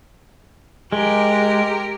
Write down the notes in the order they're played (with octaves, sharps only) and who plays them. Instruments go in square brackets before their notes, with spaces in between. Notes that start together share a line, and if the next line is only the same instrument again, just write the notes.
[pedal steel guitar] G#3 [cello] G4 A#4